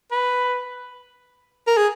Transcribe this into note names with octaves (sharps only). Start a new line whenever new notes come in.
B4
A#4
G#4